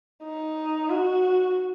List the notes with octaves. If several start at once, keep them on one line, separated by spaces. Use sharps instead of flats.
D#4
F#4